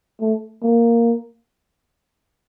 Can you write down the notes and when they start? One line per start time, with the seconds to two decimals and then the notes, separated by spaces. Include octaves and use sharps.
0.21 A3
0.63 A#3